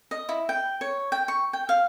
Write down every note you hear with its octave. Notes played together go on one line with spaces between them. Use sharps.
D#5
E4
G5
C#5
G5
C#6
G5
F5